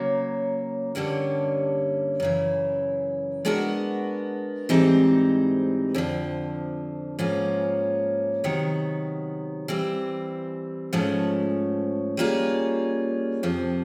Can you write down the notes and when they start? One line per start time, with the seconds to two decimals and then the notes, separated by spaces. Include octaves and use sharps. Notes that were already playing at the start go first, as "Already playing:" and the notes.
Already playing: C#3 F#3 A#3
0.95 G2 D3 G3 A#3 C#4
2.20 F#2 C#3 E3
3.45 G#3 B3 D4 F#4 A#4
4.69 G#2 E3 G3 C4 D#4
5.94 F2 D3 F3
7.19 G#2 F3 A#3 C#4
8.44 C3 D#3 F#3 B3
9.68 E3 G3 C4
10.93 G#2 F3 A3 C#4
12.17 G3 A#3 C#4 F4 G#4
13.43 F2 C3 F3